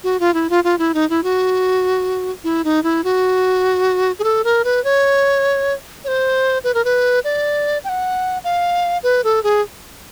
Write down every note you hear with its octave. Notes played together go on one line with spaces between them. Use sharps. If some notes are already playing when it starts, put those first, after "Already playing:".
F#4
F4
E4
F4
F4
E4
D#4
E4
F#4
E4
D#4
E4
F#4
G#4
A4
A#4
B4
C#5
C#5
C5
B4
A#4
B4
D5
G5
F#5
F5
B4
A4
G#4